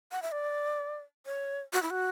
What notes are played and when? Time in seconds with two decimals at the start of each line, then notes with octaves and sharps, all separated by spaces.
0.12 F#5
0.22 E5
0.32 D5
1.26 C#5
1.73 F#4
1.82 E4
1.90 F#4